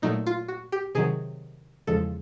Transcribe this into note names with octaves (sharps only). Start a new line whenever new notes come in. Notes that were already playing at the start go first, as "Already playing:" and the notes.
A#2 F#3 A3 D#4
F4
F#4
G4
C3 D#3 F#3 G#4
E2 C#3 F3 G#3 A4